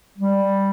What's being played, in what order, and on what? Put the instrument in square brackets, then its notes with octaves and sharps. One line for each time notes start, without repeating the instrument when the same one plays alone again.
[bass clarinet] G3